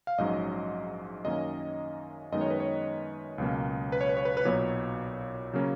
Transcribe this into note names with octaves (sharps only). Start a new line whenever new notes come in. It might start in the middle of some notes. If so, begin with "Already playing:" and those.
F5
A#1 G#2 F#3 C#4 D#5
F#2 D#3 A#3 C#4 D#5
F#2 D#3 G#3 B3 D#5
C#5
B4
C#5
C#2 B2 F#3 A#3 C#4
B4
C#5
B4
C#5
B4
B4
B1 A#2 F#3 B3 C#5
C#3 F#3 A#3 C#4